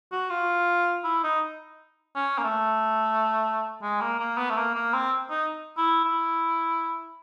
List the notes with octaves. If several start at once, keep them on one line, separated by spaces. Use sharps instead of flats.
F#4
F4
E4
D#4
C#4
A#3
A3
G#3
A#3
A#3
B3
A3
A#3
A#3
C4
D#4
E4
E4